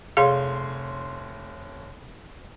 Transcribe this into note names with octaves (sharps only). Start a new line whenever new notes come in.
F1 G#4 C#5 F5 C6